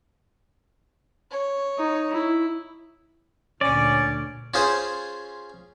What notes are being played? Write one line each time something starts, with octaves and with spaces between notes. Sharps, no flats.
C#5
D#4
E4
D2 A#2 C#4 D5
C#4 F4 G#4 C5